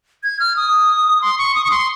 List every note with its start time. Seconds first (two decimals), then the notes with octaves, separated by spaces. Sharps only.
0.23 G#6
0.40 F6
0.56 D#6
1.22 C6
1.38 C#6
1.55 D#6
1.64 C#6
1.71 C6